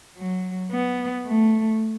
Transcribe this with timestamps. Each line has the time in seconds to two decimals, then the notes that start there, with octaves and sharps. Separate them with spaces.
0.17 F#3
0.71 B3
1.27 A3